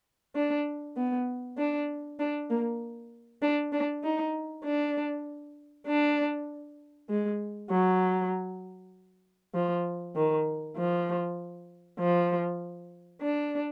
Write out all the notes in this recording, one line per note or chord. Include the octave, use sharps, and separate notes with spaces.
D4
B3
D4
D4
A#3
D4
D4
D#4
D4
D4
G#3
F#3
F3
D#3
F3
F3
D4